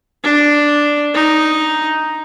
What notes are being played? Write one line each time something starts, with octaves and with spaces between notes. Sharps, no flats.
D4
D#4